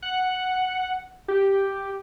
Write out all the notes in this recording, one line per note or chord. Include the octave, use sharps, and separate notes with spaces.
F#5
G4